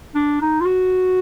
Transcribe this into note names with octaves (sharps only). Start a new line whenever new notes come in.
D4
D#4
F4
F#4